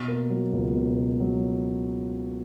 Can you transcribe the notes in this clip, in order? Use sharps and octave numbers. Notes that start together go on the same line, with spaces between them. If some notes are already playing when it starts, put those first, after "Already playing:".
Already playing: B2
A#3
F#3
C#2
B2
A#3
F#3